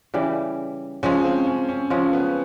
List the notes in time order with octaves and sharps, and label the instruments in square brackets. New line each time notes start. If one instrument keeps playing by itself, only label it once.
[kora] C#3 E3 G3
[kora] C#3 F3 G#3 [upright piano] C#4
[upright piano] C4
C#4
C#4
[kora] C#3 F3 G#3 [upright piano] C#4
[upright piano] B3